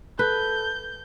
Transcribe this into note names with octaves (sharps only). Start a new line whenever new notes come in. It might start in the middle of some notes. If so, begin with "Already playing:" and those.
A4 B4 G6